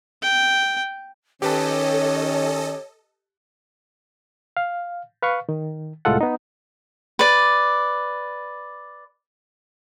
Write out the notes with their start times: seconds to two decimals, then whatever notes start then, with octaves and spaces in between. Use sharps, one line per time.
0.22 G5
1.42 D#3 C#4 G4 A4 B4 C#5 D#5 A5
4.57 F5
5.22 B4 F5 C#6
5.49 D#3
6.05 C2 A2 G#3 F4 A4 F#5
6.21 B3 D#4
7.19 B4 D5